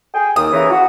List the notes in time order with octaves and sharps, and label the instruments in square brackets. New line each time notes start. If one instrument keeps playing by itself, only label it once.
[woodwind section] G#4 G5
[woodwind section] D#2 [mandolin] D#6
[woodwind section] C#3 E3 A#5
F#4